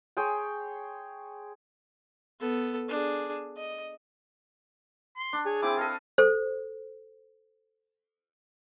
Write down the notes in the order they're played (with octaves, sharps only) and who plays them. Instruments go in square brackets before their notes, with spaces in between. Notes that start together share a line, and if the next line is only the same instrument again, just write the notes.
[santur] G#4 C#5 G5 C6
[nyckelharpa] B3 A4
D4 G#4
D#5
[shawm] C6
[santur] D4
[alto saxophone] G#4 [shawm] C#5
[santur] C4 E4 [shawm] D6
[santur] A4 D#5 [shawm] F5
[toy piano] A4 C5